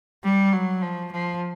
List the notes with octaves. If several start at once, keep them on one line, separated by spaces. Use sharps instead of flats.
G3
F#3
F3
F3